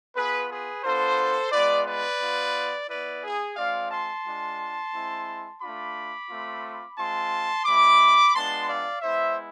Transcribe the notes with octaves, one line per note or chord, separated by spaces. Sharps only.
B3 F4 G#4 B4
G#4 B4
B3 D4 F4 A4 C5
G#3 B3 F4 B4 D5
B4 D5
B3 F4
B3 E4 B4 D5
G#4
G#3 C4 F4 D5 F5
A5 C6
G#3 D4 F4
G#3 C4 E4
A3 D4 F4 B5 D6
A3 C4 F4
G#3 C4 F4 A5 C6
G#3 C4 E4 B5 D6
G#3 B3 D4 F4 A5 C6
D5 F5
G#3 B3 E4 C5 E5